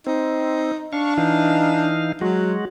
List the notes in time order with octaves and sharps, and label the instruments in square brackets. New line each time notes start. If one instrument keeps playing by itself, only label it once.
[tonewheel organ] C4 [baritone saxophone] D#4
[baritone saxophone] D4 [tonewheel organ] F5 C#6
[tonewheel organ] E3 D#4 F5
[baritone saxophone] F#3 [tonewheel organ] G#3 F#4